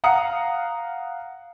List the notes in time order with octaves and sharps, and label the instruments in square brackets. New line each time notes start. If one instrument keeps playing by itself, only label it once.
[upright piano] F5 F#5 A#5 D#6 C#7